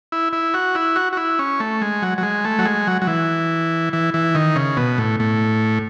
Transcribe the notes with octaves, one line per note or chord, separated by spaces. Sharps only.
E4
E4
F#4
E4
F#4
F#4
E4
C#4
A3
G#3
F#3
F#3
G#3
A3
F#3
G#3
F#3
F#3
E3
E3
E3
D#3
C#3
B2
A2
A2